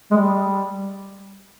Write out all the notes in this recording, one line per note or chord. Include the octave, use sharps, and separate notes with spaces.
G#3
G3